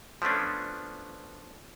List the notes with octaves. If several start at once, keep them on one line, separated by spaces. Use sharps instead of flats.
F3 A3 B3 C#4 D4